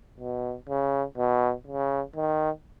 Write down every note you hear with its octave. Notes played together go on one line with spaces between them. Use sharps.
B2
C#3
B2
C#3
D#3